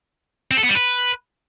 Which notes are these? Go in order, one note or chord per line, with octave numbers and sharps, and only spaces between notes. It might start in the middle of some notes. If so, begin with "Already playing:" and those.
C4
A4
B3
G3
B4